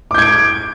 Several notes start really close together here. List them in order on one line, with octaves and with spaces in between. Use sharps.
D6 G6 G#6 D7